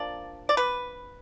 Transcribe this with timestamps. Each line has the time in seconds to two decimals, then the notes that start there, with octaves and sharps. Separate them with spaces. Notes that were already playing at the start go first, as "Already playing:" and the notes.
Already playing: F3 A#3 D4 D5
0.49 D5
0.57 B4